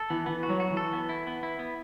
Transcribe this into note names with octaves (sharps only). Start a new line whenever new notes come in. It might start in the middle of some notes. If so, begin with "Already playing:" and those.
Already playing: A4
E3 B3
E3 B3
F#4
F#3
F#4
E3
A4
B3
E4
B3
E4
B3